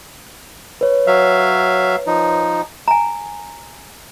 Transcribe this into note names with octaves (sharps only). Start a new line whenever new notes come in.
B4 C#5
F#3 E5 F5
F3 D#4
G#5 A#5